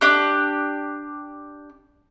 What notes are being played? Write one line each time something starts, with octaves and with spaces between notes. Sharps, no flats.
D4 G4